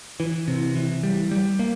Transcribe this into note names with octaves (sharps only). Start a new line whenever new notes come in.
E3
C3
E3
G3
G3
A#3